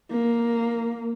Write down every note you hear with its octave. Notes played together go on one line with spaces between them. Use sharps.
A#3